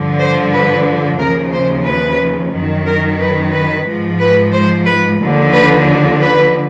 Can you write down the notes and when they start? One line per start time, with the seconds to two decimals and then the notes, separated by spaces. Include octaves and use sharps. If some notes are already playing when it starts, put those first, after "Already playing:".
Already playing: G2 D3 F3
0.18 C5
0.51 B4
1.18 D#2 C#3 F3 A#4
1.52 C5
1.85 B4
2.51 F#2 D#3
2.85 A#4
3.19 B4
3.52 B4
3.85 G#2 F3
4.19 B4
4.52 C5
4.85 B4
5.19 D#2 D3 F3
5.52 B4
6.19 B4